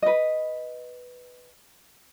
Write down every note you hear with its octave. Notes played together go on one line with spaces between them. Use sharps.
B4 D#5